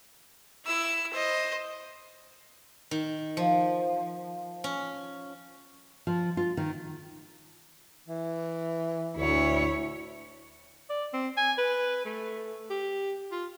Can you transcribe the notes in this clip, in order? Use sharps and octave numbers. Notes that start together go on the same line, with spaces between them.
E4 E6
C5 D#5
D#3
F3
C#4
F3
F4
D#3
E3
D2 E4 C#5
D5
C4
G#5
B4
A3
G4
F4